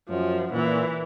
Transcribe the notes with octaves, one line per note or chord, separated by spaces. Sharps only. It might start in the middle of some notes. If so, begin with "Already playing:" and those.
F#2 F3
A#2 E3